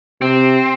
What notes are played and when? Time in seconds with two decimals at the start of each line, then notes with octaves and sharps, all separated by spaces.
0.22 C3 C4